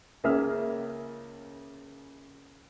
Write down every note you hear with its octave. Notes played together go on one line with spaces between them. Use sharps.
C#2 A#3 G#4 E5 F6